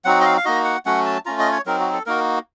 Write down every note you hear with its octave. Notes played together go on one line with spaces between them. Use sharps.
F#3 C4 D#4 F#4 F#5
D#5
F5
F5
A#3 D#4 F#4 D#5
F#5
F#3 A3 C#4 F#4 F#5
A5
A3 C#4 F4 A#5
D#5
C#5
F#3 C4 D#4 A#4
F#4
A4
A#3 D#4 F#4 A#4